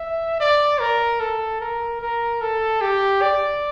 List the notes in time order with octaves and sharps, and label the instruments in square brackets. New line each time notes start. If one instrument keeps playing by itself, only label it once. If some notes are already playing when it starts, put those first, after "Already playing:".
Already playing: [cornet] E5
D5
A#4
A4
A#4
A#4
A4
G4
D5